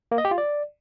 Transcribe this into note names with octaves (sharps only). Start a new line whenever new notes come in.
A#3
D#5
G4
F4
D5